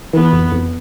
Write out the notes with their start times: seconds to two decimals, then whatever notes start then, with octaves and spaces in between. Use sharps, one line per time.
0.13 E3 B3
0.32 F2
0.52 F2